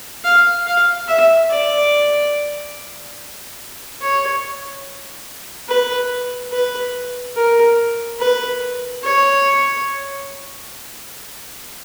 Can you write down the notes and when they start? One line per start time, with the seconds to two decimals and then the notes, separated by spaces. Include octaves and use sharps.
0.24 F5
0.66 F5
1.08 E5
1.50 D5
4.01 C#5
5.68 B4
6.52 B4
7.36 A#4
8.20 B4
9.03 C#5